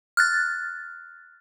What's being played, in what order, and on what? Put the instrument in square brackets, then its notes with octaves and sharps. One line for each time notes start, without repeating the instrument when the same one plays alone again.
[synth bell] F6 F#6 A6